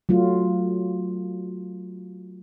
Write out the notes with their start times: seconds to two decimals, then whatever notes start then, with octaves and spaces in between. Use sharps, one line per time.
0.09 F#3 A3 F4